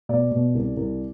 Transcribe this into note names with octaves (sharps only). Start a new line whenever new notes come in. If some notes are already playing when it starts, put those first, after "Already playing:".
B2 D5
B2
C2
C2